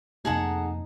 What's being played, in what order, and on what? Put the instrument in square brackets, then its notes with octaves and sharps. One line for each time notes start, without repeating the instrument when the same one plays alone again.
[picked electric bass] F2 C3 A#3 [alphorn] D#4 [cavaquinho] G#4 A4 F#5